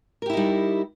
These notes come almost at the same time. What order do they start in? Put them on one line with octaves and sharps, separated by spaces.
A#4 G4 E4 D#4 G3